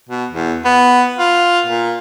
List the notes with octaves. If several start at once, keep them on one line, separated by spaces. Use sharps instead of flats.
B2
E2
B3
F4
A#2